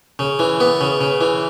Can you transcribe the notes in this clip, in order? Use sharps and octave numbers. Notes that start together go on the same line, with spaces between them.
C#3
E3
B3
C#3
C#3
E3